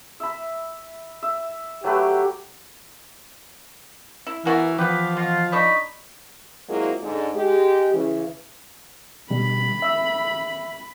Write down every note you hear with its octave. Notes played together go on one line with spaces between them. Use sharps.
E5 B5
E5
F#3 A3 G4 B4
E4
E3 B3 F#4 A#4
E3 F3 B3 G4 B4
B2 F4
D4 D#4 B5 C#6
F#3 G#3 A#3 C4 E4 F4
G#2 D3
G#3 G4
C#3 E3
B2 D3 G3 B5
E5 E6